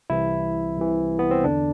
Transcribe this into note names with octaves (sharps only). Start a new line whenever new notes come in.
C2 C3 E3 E4
C2 C3 E3
B3
C4
E2 D3 D4